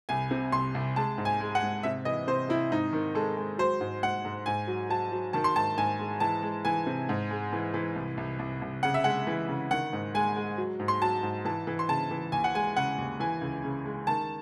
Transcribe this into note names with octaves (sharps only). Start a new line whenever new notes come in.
C2 G#5
C3
C2 C6
C2
G#3 A5
G#2
G#5
G#3
F#5
G#2
C3 E5
E3 D#5
C3 C5
C3 E4
G#2 D#4
D#3
G#3 A4
G#3
F#3 C5
G#2
G#2 F#5
G#2
G#2 G#5
F#3
F#3 A5
F#3
D#3 A5
C6
G#2 A5
G#2 G#5
G#3
E3 A5
G#3
E3 G#5
C3
G#2
G#3
E3
E3
C2
C2
C2
C2
C#3 F#5
E5
G#3 F#5
E3
C#3
D#3 F#5
G#2
G#3 G#5
G#3
F#3
G#2
C6
F#3 A5
G#2
E3 A5
E3
C6
C#3 A5
E3
D#2 G#5
F#5
G#3 G#5
C#3 F#5
D#2
E3 G#5
C#2
C#3
G#3
D#3 A5